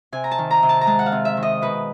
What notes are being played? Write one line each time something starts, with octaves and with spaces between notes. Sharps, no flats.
C3 G#5
A#5
A5
D#3
A#5
C3
A5
A#5
G#3 A5
F#5
F5
C3
E5
D#3
D#5
B2 B4